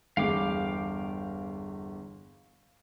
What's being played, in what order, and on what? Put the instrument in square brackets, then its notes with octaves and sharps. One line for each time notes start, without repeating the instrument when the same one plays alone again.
[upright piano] G1 E2 [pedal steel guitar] F5 G5 D6